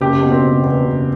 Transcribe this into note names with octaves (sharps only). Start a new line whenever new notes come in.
F#1 G4
B2
C4
F#1
E2
F#1